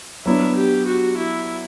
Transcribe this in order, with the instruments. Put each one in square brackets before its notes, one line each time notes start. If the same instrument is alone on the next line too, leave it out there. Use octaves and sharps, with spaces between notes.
[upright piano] F#3 B3 D4 [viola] E4
[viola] G4
F#4
E4